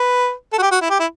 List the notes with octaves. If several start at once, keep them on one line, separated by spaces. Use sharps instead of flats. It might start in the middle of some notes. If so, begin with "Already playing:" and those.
Already playing: B4
A4
F#4
G4
F#4
E4
G4
E4